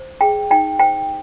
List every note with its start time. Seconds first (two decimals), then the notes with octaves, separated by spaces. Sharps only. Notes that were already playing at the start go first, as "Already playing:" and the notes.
Already playing: C5
0.21 G#4 G5
0.50 D#4 G5
0.80 C5 G5